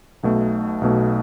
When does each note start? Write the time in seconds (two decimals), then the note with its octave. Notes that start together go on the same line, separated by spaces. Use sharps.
0.23 B1 B2 A3
0.81 B1 B2 A3